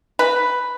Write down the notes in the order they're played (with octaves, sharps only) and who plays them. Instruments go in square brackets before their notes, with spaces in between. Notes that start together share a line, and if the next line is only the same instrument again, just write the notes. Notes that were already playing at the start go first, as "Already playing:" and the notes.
[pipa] B4